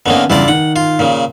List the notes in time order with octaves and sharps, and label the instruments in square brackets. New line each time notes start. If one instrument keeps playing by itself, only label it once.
[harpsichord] D3 D#3 A#3 [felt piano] B3 C#4
[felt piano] E2 G2 C#3 [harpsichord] E4 F4 D5
[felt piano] D#3 [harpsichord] F#5
[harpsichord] F4
A#2 C#3